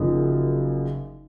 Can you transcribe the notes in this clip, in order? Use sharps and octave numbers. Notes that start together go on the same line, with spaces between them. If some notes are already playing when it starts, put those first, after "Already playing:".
Already playing: F#1 F#2 C#3 F3 D#4